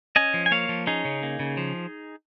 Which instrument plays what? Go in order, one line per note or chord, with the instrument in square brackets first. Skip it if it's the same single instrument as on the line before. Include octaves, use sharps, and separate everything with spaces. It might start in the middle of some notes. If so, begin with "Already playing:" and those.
[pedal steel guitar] C#4 D#5 G#5
F3
G#5
A#3 C#5 F5
F3
C#4 D#4 G#4
C#3
A#3
C#3
F3